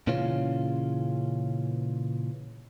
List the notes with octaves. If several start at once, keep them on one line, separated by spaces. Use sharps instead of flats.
A#2 C#3 E3 C#4 F4